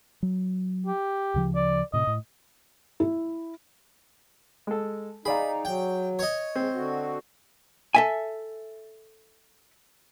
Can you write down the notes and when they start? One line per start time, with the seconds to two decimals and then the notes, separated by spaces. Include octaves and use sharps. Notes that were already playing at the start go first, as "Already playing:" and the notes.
0.23 F#3
0.87 G4
1.34 D2 C#3 F3
1.55 D5
1.93 A2 C3 D#5
2.07 A2
3.00 E4
4.67 G#3 A4
5.25 D#4 G#4 D5 F5 B5
5.65 F#3 G5
6.19 C#5 D#5
6.55 G#3 C4
6.74 D3 F#4
7.95 A4 E5 G#5